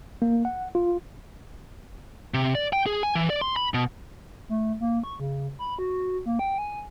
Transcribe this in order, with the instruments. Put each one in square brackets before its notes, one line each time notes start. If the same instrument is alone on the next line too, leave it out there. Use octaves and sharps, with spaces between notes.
[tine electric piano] A#3
F#5
F4
[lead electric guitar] C3
D5
G5
G#4
G#5
E3
D5
C6
B5
B2
[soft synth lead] A3
A#3
C#6
C#3
B5
F#4
A#3
G5
G#5